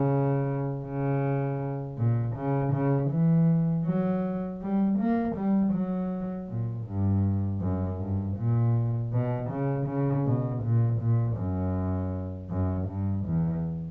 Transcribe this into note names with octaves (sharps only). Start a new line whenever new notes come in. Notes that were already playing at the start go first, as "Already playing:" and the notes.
Already playing: C#3
C#3
A#2
C#3
C#3
E3
F#3
G3
A#3
G3
F#3
A#2
G2
F#2
G2
A#2
B2
C#3
C#3
B2
A#2
A#2
F#2
F#2
G2
E2